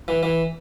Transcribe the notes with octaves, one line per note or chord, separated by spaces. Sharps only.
E3
E3